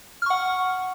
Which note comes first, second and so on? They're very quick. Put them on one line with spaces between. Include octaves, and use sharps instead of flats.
F6 C#6 F#5